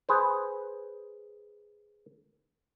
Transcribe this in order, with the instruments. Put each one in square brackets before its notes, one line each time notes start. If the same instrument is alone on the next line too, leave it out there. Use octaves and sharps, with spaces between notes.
[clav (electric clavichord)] G#4 B4 C5